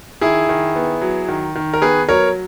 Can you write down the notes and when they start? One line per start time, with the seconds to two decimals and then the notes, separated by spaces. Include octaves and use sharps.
0.21 D#3 E4 G#4
0.49 D#3
0.76 B3
1.01 F#3
1.28 D#3
1.55 D#3
1.74 A#4
1.82 B3 G#4 B4
2.09 F#3 A#4 C#5